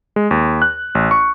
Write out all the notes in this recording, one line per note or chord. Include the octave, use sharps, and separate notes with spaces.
G#3
D#2
F#6
A1
C#6